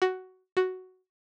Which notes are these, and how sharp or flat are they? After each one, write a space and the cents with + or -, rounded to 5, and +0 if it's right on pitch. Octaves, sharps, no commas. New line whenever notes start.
F#4 +10
F#4 +5